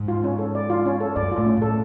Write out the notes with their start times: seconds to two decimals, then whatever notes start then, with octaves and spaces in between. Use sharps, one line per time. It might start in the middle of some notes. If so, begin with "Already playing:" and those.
Already playing: G#2
0.08 F4
0.24 C#4
0.39 A4
0.55 D5
0.70 F4
0.86 C#4
1.00 A4
1.16 F#2 D5
1.32 A2 F4
1.47 C#4
1.57 A2 A4